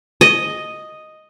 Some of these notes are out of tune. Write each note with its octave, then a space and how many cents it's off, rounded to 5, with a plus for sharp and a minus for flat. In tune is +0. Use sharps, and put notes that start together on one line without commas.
D#5 +0